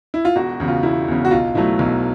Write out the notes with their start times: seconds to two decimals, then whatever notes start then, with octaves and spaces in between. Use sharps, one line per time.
0.14 E4
0.25 F4
0.36 E1 F#4
0.60 E2 C#3
0.68 F4
0.83 E1 E4
1.08 E2 C#3
1.25 F#4
1.31 B1 F4
1.55 B2 F#3 A3 E4
1.79 B1